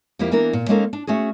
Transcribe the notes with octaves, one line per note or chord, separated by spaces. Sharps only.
F2 F3 A#3 E4 G4
E3 A#3 B3 D4 A#4
A#2
G#3 A#3 C#4 D#4 A4 A#4
D4
A3 C#4 F#4 G#4